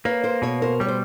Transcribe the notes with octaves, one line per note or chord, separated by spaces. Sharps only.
A#3 B4 C#5
A#4 C5
B2 B4 C#5
A#4 C5
G3 C#5
C5